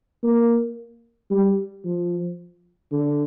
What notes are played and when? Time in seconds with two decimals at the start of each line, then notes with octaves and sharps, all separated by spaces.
0.23 A#3
1.30 G3
1.84 F3
2.92 D3